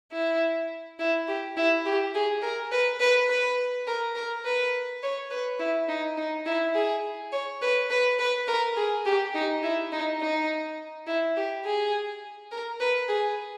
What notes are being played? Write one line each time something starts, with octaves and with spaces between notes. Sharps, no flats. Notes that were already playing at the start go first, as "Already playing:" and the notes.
E4
E4
G4
E4
G4
G#4
A#4
B4
B4
B4
A#4
A#4
B4
C#5
B4
E4
D#4
D#4
E4
G#4
C#5
B4
B4
B4
A#4
G#4
G4
D#4
E4
D#4
D#4
E4
G4
G#4
A#4
B4
G#4